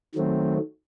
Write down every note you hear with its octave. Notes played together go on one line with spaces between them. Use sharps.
D#3 F#3 A3 C4